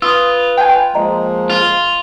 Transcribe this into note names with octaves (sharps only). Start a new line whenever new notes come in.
F4 B4 D#6 E6
G5 G#5
F3 G#3 A#3 D#5 A#5
F4